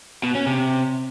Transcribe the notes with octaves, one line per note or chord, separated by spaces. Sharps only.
B2
C#4
C3